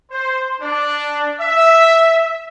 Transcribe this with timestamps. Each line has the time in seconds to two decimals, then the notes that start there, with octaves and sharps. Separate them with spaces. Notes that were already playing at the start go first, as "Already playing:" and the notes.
0.11 C5
0.61 D4
1.41 E5